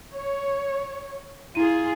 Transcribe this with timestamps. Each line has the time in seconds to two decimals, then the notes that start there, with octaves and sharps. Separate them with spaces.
0.14 C#5
1.55 E4 F4 G#4 D#7